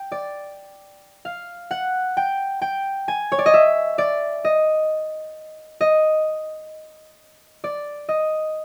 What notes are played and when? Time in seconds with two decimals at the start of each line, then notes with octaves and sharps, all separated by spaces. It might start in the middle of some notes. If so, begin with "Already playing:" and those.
Already playing: G5
0.12 D5
1.25 F5
1.71 F#5
2.17 G5
2.62 G5
3.08 G#5
3.32 C#5
3.39 D5
3.46 D#5
3.54 E5
3.98 D5
4.45 D#5
5.81 D#5
7.64 D5
8.09 D#5